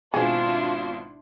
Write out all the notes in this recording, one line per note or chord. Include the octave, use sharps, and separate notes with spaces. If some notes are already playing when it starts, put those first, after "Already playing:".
G#1 B2 C4 D4 E4 F4 G#4 C6